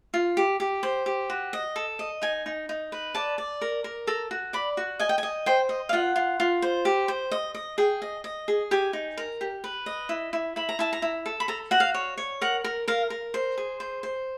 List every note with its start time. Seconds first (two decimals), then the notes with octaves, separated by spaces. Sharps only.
0.14 F4
0.37 G4
0.60 G4
0.83 C5
1.06 G4
1.30 F#4
1.53 D#5
1.76 A4
1.99 D#5
2.22 D#4 G#5
2.46 D#4
2.69 D#4
2.92 B4
3.15 D5 A5
3.38 D5
3.61 A#4
3.84 A#4
4.07 A4 A#5
4.31 F#4
4.53 D5 B5
4.77 F#4
4.99 D#5 G#5
5.09 G5
5.18 G#5
5.23 D#5
5.46 C5 G5
5.69 D#5
5.89 F5
5.93 F4 F#5
6.16 F4
6.40 F4
6.62 C5
6.85 G4
7.08 C5
7.31 D#5
7.55 D#5
7.78 G#4 G5
8.02 D#5
8.24 D#5
8.48 G#4
8.71 G4 G#5
8.93 D#4
9.18 A#4
9.41 G4
9.64 B4
9.86 D#5
10.09 E4
10.33 E4
10.56 E4 B5
10.69 A#5
10.79 E4 A5
10.93 A#5
11.02 E4
11.26 A4
11.40 B5
11.48 A4 A#5
11.71 F#4 F#5
11.80 F5
11.95 C#5
12.18 C#5
12.41 A#4 F#5
12.64 A#4
12.88 A#4 F5
13.10 A#4
13.34 C5
13.58 G#4
13.80 C5
14.03 C5